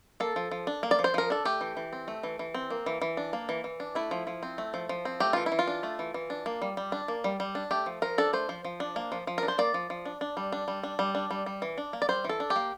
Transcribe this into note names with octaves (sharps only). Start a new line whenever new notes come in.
A#3 A4
F3
F3
D4
A#3
D5
F3
C5
F3 A#4
D4 A4
A3 G4
E3
E3
C4
A3
E3
E3
C4
A#3
E3
E3
D4
A#3
E3
E3
D4
A3 E4
F3
F3
C4
A3
F3
F3
C4
A3 G4
E3 F4
E4
E3
F4
D4
A3
E3
E3
D4
A#3
G3
G3
D4
A#3
G3
G3
D4
A3 G4
F3
F3 A#4
D4 A4
A3 C5
F3
F3
D4
A#3
F3
F3
A#4
D4
C5
A#3 D5
F3
F3
D4
D4
G3
D4
G3
D4
G3
D4
G3
G3
E3
D4
A#3
D5
G3 C5
E3
A4
D4
G4
A#3